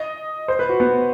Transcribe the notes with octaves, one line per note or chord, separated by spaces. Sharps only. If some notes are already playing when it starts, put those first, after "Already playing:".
Already playing: D#5
C5
B4
F#4
B3